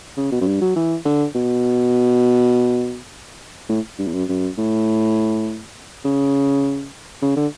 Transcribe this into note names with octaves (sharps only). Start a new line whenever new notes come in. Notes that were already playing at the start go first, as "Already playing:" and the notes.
C#3
B2
F#2
G2
F#3
E3
D3
B2
A2
G2
E2
F#2
F#2
A2
C#3
C#3
D3